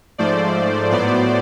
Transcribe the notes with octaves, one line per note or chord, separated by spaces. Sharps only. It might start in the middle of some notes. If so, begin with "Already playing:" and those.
G#2 F3 A3 C5 D5
A2 F#3 B3 C5 D5